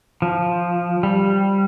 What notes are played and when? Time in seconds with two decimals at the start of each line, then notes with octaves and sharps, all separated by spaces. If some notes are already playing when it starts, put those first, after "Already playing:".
0.22 F3
1.03 G3